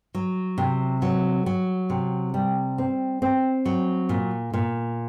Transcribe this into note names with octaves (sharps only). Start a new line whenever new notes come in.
F#3
C3
F#3
F#3
C3
G3
C4
C4
F#3
A#2
A#2